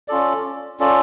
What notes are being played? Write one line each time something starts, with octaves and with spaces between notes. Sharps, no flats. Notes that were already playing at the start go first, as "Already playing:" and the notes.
C#4 F4 A4 D5
C#4 F4 A4 D5